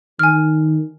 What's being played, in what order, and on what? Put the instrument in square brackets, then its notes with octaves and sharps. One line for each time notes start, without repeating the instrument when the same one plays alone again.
[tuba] D#3 [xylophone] G#5 F6